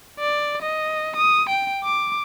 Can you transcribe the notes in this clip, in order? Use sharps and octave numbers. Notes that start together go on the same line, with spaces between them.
D5
D#5
D#6
G5
D6